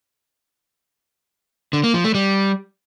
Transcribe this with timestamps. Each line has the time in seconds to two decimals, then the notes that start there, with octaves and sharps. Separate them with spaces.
1.73 D3
1.83 A#3
1.94 F3
2.04 A3
2.15 G3